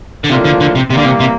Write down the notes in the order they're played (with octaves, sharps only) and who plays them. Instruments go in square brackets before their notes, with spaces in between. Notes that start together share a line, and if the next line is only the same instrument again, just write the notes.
[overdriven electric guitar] D3
[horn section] A2 F3 A#3 D4 F4 [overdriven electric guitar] C3
[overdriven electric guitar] D3
D3
C3
[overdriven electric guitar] C3 [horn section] E3 G3 A#3
[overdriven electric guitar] D3
C3
C3